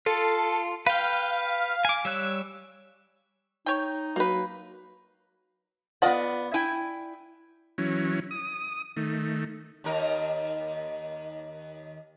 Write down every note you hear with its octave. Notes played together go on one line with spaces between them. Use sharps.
F4 A4
B4 F5 G5
G#5 D6
G3 C#5 E6 F#6
D#4 C#5 G5
F#3 A#3 B4
B3 F4 D5 D#5 F#5
E4 G5 G#5
E3 F#3 C#4
D#6
D#3 A3
D#2 D#4 A#4